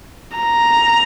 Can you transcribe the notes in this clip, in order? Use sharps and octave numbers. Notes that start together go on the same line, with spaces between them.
A#5